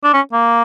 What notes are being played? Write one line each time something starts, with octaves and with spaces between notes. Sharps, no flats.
D4
C#4
A#3